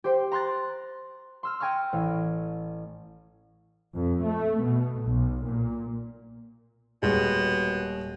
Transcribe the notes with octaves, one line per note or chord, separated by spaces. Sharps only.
G4 C5 G5
A#5 C6 F#6 A6
C6 E6 F6
G5 G#5 A#5 C#6 F6
A1
F2
A3
B2
B1
A#2
D#1 B2 G#3